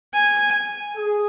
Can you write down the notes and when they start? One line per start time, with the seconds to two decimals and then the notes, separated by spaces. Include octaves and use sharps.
0.14 G#5
0.97 G#4